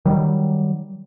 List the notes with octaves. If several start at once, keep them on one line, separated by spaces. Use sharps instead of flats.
D#3 F#3 G3